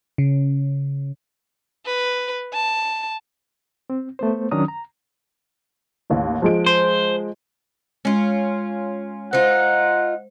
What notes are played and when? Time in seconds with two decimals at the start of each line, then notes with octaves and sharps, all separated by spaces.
0.18 C#3
1.86 B4
2.53 A5
3.90 C4
4.19 A3 B3 C5
4.51 D#3 F#3 C#4 D4 A#5 D#6
4.68 A#5
6.10 A1 D#2
6.42 F3 G#3 D7
6.66 C5
8.05 G#3 C#4 F4
9.33 D#4 F4 C5 F#5